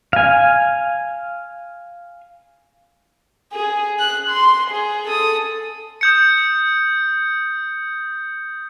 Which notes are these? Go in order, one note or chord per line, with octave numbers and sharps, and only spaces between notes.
F5 G#5
G#4
F#6
C6
G#4
A4 D#6
D#6 G6 C#7